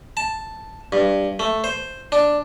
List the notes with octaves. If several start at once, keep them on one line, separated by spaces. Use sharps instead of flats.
A5
G2
A3
C5
D4